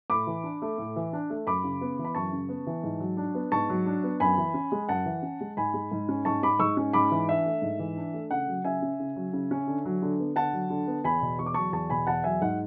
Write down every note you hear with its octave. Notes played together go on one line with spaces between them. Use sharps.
A2 B5 D6
E3
D4
A3
A2
E3
D4
A3
F#2 B5 D6
C#3
B3
E3
B5
F#2 A5 C#6
C#3
B3
E3
G#2
F#3
D4
B3
G#2 A5 C#6
F#3
D4
B3
F#2 G#5 B5
E3
C#4
G#3
F#2 F#5 A5
E3
C#4
G#3
G#2 G#5 B5
G#3
G#2
C#4
G#2 A5 C#6
G#3 B5 D6
G#2 C#6 E6
C#4
G#2 B5 D6
E3
D4 E5
A3
G#2
E3
D4
A3
C#3 F#5
F#3
C#3 E5 G#5
C#4
C#3
F#3
C#3
C#4
D3
F#3
D3
B3
D3 F#5 A5
F#3
D3
B3
E2 G#5 B5
B2
E2 C#6
D6
F#3 A5 C#6
E2 A5 C#6
B2 G#5 B5
E2 F#5 A5
F#3 E5 G#5
G#2 F#5